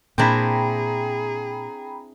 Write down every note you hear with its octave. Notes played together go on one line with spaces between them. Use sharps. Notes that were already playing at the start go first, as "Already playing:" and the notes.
A#2 C4 D4 E4 G#4 G5 A#5 B5